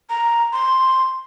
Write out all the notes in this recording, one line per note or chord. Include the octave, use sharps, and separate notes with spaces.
A#5
C6